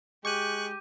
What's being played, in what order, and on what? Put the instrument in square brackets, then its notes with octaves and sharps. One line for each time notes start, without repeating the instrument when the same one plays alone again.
[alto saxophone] G#3 [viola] G4 [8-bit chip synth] C#6 F#6 [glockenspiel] D6 G6 D#7